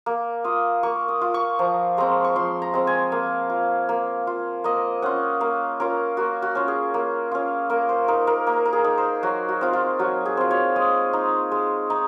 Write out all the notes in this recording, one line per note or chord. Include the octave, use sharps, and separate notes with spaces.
A#3
F4 D#6
A#3 C#6
D#6
F4
C#6
F3 A#5
G#3 C4 A#5
C#6
F3 C6
A#5
G#3 C4
G#5
A#3 F5
F4
A#3
F4
A#3 D#5
C#4 F4 F#5
A#3 F5
C#4 F4 A#4
A#3 F#4
F#4
C#4 F4
G#4
A#3
C#4 F4
A#3 A#4
C5
D#4 A#4
A#4
A#3 A#4
A#4
G#4
D#4
C5
F#3 F#4
F#4
C4 F4
F4
F#3 F#4
G#4
C4 F4
C#5
G#3 D#5
D#4
G#3
D#4